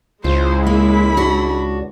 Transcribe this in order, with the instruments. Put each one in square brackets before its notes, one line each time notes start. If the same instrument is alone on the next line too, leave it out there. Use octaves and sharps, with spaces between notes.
[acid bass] C#2 [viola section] G#3 E4 [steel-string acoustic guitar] F4 [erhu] C5
[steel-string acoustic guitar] A#3 [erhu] B5
[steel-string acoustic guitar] D4 F#4